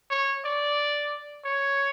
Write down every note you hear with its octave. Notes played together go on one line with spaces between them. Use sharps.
C#5
D5
C#5